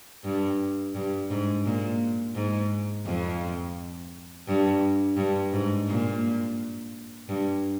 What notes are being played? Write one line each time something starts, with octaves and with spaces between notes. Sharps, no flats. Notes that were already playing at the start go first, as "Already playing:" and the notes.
G2
G2
G#2
A#2
G#2
F2
G2
G2
G#2
A#2
G2